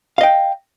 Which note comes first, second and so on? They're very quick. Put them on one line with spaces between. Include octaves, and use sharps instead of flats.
F5 D#5 G5